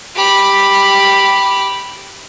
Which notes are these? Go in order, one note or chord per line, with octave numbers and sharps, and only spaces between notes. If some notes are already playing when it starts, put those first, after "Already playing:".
G4 B5